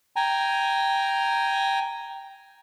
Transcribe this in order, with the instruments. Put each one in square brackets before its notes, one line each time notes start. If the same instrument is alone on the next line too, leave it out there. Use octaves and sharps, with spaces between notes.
[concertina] G5 G#5 A#5